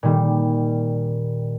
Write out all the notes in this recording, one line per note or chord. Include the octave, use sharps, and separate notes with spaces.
A#2 D#3 G3